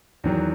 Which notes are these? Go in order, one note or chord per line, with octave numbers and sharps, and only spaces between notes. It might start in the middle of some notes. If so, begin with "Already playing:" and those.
E2 D#3 F#3